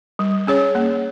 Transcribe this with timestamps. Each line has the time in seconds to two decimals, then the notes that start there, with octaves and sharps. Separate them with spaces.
0.19 G3
0.47 C#4 G#4 C#5
0.75 A#3